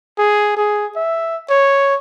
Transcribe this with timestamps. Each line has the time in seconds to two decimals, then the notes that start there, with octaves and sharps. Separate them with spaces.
0.18 G#4
0.57 G#4
0.96 E5
1.50 C#5